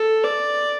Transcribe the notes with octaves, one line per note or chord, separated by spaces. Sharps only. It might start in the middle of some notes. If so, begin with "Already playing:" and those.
Already playing: A4
D5